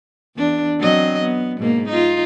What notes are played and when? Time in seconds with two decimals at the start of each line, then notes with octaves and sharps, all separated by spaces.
0.36 E2 D4
0.80 F#3 C4 D#5
1.22 B3
1.59 G#2 B2 A#3
1.89 D#4 F4